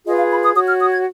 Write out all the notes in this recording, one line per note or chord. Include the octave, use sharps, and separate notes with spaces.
F4 G#4 B4 D#5
F5
B5
D#6
F#4 C#5 D#6
F6
D#6
G#6